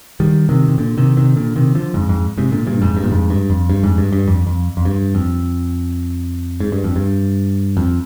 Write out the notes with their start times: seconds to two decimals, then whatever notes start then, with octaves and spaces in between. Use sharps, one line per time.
0.20 D#3 G3
0.49 C3 D#3
0.68 C3
0.78 A#2 D3
0.97 C3 D#3
1.17 C3 D#3
1.36 A#2 D3
1.56 C3 D#3
1.75 D3 F3
1.94 F2 G#2
2.09 F2 G#2
2.38 G#2 C3
2.52 A#2 D3
2.67 G2 A#2
2.82 F2 G#2
2.97 G2
3.04 A#2
3.11 F2 G#2
3.30 G2
3.50 F2
3.70 G2
3.83 F2 G#2
3.98 G2
4.13 G2
4.28 F2
4.47 F2
4.77 F2
4.85 G2
5.15 F2
6.60 G#2
6.72 G2
6.84 F2
6.96 G2
7.77 F2